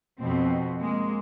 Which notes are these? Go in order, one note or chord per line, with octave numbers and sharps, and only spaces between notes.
F2 B2 C4
G#3 A#3